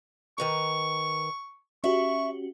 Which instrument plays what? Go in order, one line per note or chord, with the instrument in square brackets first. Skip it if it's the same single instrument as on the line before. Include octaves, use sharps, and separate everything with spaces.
[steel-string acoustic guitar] D#3 B4 A#5 [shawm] C#6
[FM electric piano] C#4 F#4 G4 [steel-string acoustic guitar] E5 [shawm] C#6